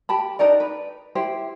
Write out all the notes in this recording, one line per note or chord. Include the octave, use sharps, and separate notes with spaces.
G4 A5 B5
D4 D#4 A#4 D5
B4
E4 G4 C5